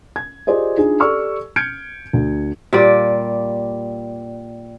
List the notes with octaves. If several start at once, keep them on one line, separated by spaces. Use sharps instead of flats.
G#6
F4 G4 G#4 C5 D5 D#5
D4 D#4 F4 G#4
G4 A4 D5 C#6 E6 F6
F6 G6 G#6 C#7 D7
D2
A#2 G3 D5